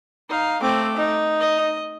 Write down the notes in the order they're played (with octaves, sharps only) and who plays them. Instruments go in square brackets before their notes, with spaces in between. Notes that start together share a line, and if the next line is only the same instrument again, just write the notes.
[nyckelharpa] D#4 F5
[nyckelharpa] A3 D6 [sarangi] C4
[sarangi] D#4
[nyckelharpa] D#5